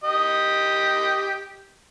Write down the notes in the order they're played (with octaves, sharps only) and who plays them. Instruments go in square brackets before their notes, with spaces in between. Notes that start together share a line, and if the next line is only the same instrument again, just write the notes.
[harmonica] G4 D#5